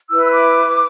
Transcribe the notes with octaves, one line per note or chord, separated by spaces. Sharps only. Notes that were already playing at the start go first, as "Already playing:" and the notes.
E4 B4 E6
E6
D6